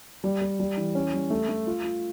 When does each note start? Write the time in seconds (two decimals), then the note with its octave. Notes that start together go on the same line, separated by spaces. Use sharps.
0.24 G3
0.42 G3
0.60 G3
0.77 E3
0.95 C#4
1.13 G3
1.30 A3
1.49 A3
1.67 F4
1.84 F4